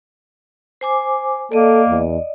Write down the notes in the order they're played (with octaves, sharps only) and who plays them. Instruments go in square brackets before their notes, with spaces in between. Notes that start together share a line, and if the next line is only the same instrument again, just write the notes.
[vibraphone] C5 G#5 D6
[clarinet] A#3 [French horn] A4 [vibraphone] D5 D#5
[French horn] E2